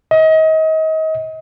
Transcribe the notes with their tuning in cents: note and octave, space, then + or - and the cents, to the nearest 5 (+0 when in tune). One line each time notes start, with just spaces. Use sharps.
D#5 +35